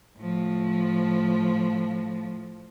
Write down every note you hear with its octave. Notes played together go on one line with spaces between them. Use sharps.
A2 F3